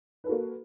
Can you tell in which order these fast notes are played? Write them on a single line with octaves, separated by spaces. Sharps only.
B4 A4 F#4 A#3